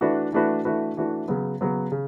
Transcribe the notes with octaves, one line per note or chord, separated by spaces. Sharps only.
E3 A3 D4 F#4 B4
E3 A3 D4 F#4 B4
E3 A3 D4 F#4 B4
E3 A3 D4 F#4 B4
C#3 F#3 B3
C#3 F#3 B3
C#3